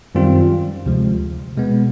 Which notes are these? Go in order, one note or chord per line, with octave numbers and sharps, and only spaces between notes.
F#2 D#3 G3 C4 F4
D2 C3 F3 G#3
B2 G#3 B3